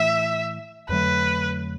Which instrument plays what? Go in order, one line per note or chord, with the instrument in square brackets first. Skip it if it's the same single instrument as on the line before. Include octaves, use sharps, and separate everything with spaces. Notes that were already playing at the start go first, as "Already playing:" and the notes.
Already playing: [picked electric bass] A2 E3 A3 [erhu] E5
[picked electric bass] F2 D3 F#3 A3 [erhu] B4